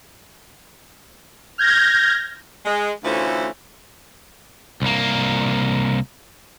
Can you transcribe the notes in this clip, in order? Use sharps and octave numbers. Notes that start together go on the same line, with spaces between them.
F6 G6 G#6 A#6
G#3
D2 E3 A3 C#4 F4 C5
C2 A#3